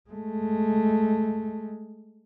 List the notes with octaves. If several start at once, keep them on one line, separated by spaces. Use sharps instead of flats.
G#3 A3